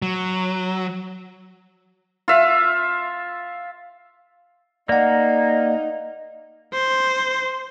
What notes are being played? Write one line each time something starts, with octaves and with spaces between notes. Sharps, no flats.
F#3
F4 E5
A#3 D#4 D5 F#5
C5